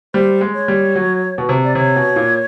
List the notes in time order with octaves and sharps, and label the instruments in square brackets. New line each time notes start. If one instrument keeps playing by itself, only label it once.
[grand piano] G3 [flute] C5
[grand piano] G#3
[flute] C#5
[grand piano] G3
F#3
B2
C3
[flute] D5
[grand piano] C3 [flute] C#5
[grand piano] B2
A#2